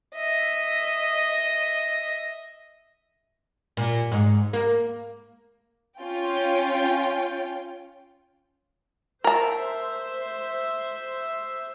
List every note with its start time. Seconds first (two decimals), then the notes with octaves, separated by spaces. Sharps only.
0.15 D#5 E5
3.77 A#2
4.12 G#2
4.53 A#3
5.99 C#4 F4 G5
9.24 A#4 C5 E5 A5